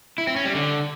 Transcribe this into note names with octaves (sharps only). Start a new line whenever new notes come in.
E4
C4
C#4
G3
D3